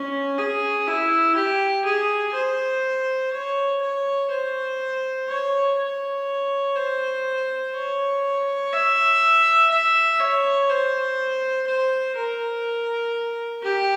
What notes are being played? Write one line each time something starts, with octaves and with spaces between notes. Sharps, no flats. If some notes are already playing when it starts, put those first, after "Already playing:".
Already playing: C#4
G#4
E4
G4
G#4
C5
C#5
C#5
C5
C#5
C#5
C5
C#5
E5
E5
C#5
C5
C5
A#4
G4